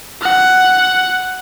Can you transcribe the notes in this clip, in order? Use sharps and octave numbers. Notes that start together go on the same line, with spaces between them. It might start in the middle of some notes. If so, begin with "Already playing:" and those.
F#5